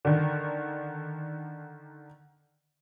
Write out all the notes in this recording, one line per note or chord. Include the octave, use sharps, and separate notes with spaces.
D3 D#3